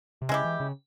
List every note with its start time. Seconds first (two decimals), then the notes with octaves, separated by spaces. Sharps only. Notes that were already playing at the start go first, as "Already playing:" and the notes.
0.22 C3
0.29 C#3 G#3 E4 G4
0.44 E3
0.60 C#3